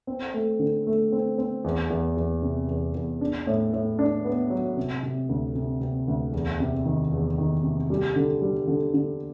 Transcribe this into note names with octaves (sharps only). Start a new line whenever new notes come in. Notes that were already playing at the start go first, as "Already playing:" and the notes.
C4
A3
D3
A3
C4
C4
E2
E2
E2
C3
E2
E2
D4
A2
A2
D4
B3
F#3
C3
C3
D2
C3
C3
D2
E2
C3
D#3
E2
D#3
C3
G3
D3
G3
D3
D3